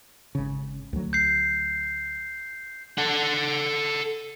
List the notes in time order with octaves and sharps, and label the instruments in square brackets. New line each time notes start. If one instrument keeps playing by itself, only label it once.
[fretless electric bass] G#1 C#3
D2 F#3
[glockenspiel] G6 C7
[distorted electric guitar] A4 F#5